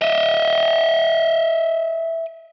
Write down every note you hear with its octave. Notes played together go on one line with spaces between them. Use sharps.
D#5 E5